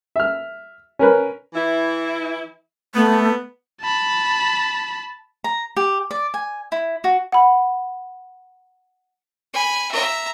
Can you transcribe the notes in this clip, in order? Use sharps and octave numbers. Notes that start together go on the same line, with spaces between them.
E5 F6
C#4 A#4 B4
E3 E4
A3 B3
A5 B5
A#5
G4
D5
G#5
E4
F#4
F#5 B5
G#5 B5
E5 A#5